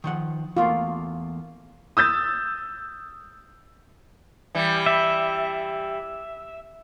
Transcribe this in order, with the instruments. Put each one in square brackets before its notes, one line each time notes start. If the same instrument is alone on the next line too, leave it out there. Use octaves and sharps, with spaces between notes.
[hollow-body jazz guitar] D#3 F3 F#5
[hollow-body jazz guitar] E2 A3 A#3 [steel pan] F4
[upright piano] D#6 E6 G6 A6
[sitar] E3 G3
[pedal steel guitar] E5